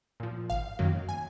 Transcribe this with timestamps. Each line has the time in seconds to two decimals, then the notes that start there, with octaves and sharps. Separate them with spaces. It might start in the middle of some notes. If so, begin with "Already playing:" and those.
0.20 A#2 F3
0.50 G#1 F5
0.79 F#2 D#3 F#3 A#3
1.09 G#5